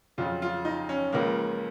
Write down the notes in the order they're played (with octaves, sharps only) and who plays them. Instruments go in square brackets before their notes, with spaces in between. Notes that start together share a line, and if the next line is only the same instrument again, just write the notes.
[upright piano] F2 C#3 F#3 F4
F4
D#4
C#4
C#2 C#3 F3 G#3 A#3